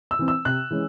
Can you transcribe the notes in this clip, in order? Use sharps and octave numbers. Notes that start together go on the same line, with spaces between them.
E6
E3 C4
E6
C3 F#6
E3 G#3 C#4